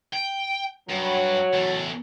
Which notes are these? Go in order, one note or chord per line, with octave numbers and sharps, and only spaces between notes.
G5
G2 F#3
E2 A3